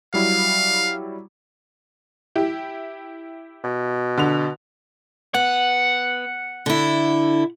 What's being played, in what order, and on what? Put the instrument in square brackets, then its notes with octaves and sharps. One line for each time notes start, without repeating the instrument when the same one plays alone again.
[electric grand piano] F#3 G3 E4 [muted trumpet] F5
[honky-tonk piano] E4 G4
[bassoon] B2
[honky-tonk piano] D3 F7
[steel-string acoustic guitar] B3 [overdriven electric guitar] F#5
[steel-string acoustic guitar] D3 E4